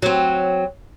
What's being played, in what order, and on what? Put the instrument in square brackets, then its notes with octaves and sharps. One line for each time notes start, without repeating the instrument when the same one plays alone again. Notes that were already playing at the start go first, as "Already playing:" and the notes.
[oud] F#3 C4